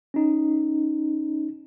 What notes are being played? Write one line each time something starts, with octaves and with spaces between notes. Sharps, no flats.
C#4 D#4